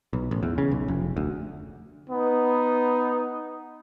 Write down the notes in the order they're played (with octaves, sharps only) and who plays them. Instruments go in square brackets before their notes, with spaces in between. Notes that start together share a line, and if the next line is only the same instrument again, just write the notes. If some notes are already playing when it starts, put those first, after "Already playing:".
[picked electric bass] B1
A1
E2
C#3
B1
F1
D2
[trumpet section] B3 D#4